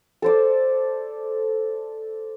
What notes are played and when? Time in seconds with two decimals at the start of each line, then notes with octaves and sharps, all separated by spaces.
0.22 A4 C5 D5